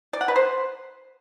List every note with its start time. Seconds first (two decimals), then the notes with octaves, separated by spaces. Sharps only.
0.13 D5
0.21 F#5
0.28 B4
0.36 C5